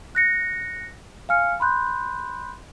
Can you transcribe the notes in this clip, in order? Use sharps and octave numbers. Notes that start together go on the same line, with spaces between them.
F#6 A#6 C#7
F5 G#5 F6 C#7
B5 C6 F#6 G6